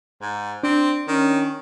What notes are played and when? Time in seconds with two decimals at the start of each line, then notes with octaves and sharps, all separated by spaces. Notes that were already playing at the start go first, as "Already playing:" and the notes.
0.22 G#2
0.63 C4 D4
1.08 D#3 C#4